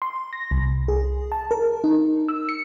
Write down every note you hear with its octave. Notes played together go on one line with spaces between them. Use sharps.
C6
A#6
C2
G#4
A5
A#4
D#4
E6
C#7